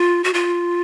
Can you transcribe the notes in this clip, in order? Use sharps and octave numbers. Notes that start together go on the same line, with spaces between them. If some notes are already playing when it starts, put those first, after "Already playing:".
Already playing: F4
F#4
F4